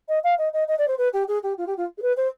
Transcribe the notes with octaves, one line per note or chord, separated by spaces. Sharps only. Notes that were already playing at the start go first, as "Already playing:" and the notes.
D#5
F5
D#5
D#5
D#5
D5
C5
B4
G4
G#4
G4
F4
G4
F4
G#4
B4
C5